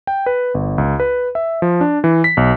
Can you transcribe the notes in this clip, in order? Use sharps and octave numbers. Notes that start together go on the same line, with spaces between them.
G5
B4
G1
C#2
B4
E5
F3
D4
E3
B6
B1